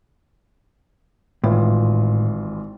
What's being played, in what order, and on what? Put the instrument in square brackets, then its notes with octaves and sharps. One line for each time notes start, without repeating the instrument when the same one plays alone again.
[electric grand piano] G#1 E3 F4 [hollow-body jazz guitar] A2